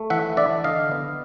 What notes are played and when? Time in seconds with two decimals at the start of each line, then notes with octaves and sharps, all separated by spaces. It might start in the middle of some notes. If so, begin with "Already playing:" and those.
Already playing: A3
0.10 E3 E5 F#5
0.37 D4 D5 E5
0.64 D3 D#5 F5
0.91 B3